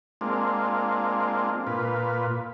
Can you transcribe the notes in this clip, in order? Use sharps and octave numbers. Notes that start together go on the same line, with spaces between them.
G#3 A#3 C4 D4 F4
A#2 F4 B4